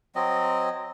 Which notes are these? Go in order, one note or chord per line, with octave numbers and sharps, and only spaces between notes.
F#3 C4 D#5